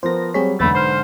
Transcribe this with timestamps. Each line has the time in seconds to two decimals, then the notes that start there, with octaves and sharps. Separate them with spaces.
0.03 F3 B3 A#4 C5 A#6
0.34 F#3 G3 C4 G#4 C#5 B6
0.60 B1 E2 G#2 D3 A3 B4 A6
0.75 C5 C6 F6